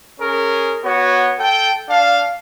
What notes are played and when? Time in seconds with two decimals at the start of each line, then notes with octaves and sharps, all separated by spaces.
0.19 C#4 G#4 A#4
0.84 B3 F#4 C#5
1.39 A4 G5
1.89 D4 F5